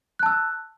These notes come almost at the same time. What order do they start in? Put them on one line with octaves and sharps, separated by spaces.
F#6 A5 E6